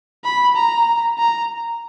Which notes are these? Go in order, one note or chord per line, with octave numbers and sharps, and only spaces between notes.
B5
A#5
A#5